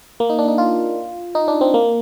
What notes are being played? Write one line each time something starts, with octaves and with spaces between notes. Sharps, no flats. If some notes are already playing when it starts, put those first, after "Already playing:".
A#3
D#4
D4
D#4
F4
D#4
D4
C4
A#3